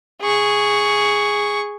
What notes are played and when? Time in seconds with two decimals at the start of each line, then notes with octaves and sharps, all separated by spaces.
0.22 G#4 C#6